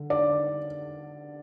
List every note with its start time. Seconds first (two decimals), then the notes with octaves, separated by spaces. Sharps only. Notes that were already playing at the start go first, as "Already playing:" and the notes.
Already playing: D3
0.10 D5